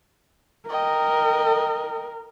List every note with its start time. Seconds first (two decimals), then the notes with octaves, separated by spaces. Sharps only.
0.69 A#4 D#5 G5